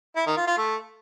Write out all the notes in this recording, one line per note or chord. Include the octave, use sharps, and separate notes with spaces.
E4
D#3
F4
F4
A3